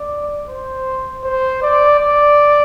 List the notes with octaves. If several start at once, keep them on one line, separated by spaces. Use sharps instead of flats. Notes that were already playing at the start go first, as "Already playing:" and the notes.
Already playing: D5
C5
C5
D5
D5